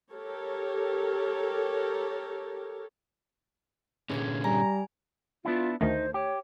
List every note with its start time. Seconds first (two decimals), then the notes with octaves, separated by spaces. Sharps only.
0.14 G4 A4 A#4 C#5
4.10 A#2 D3 C#4 G#4 B4 G#6
4.44 G3 G#5 A#5
5.45 B3 D4 E4 F4
5.81 D2 D#3 A3 D#4 C5
6.14 G4 C#5